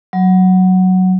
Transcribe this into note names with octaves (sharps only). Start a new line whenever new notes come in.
F#3